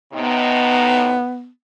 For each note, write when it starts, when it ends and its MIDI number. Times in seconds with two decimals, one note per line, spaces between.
0.13 1.16 45
0.13 1.16 48
0.13 1.49 59
0.13 1.16 63